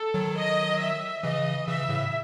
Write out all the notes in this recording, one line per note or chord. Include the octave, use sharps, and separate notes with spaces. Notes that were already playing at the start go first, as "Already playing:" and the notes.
Already playing: A4
D#3 F#3
D#5
E5
C#3 E3 D#5
C#3 E3 E5
A2 C#3